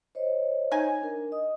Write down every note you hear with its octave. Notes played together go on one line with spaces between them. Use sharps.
C5 C#5 D#5
D#4 G#5
D4 A#4
D#5 D#6